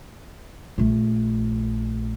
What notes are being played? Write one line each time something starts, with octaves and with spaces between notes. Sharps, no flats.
A#1 A3